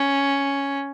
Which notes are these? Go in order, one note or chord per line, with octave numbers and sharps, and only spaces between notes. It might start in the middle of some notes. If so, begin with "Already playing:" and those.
Already playing: C#4